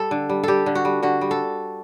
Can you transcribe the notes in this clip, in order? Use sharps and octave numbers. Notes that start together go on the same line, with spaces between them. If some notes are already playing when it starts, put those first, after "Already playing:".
Already playing: G3 A4
D3
G3
G3 G4 A4
D3
F#4
G3
D3 F#4
G3
A4